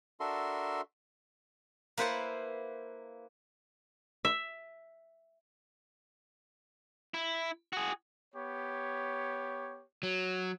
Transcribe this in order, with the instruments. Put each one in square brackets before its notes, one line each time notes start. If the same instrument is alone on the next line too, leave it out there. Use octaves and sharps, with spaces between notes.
[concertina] D4 F#4 A4 A#4 E5 C6
[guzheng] A#3 E4 B4 C5 F#5 A5
[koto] E5
[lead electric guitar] E4
F#4 G#4
[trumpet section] B3 G4 C#5
[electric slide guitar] F#3